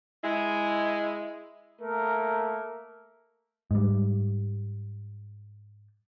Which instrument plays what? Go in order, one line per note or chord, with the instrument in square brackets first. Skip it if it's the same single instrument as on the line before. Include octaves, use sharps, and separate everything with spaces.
[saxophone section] G#3 E4
[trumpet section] A3 A#3 A#4
[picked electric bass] G#2 G3